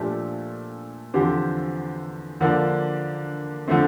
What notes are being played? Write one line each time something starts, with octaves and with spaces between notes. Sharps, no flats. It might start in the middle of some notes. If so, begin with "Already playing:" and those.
Already playing: A#2 F3 A3 D4 G4
E2 D3 F3 C4 G4
D3 F3 A#3 D4
D3 F3 A3 C4